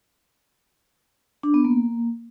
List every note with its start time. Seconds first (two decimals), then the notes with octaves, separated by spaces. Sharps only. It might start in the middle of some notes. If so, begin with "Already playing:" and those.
1.43 D4
1.54 B3
1.64 A#3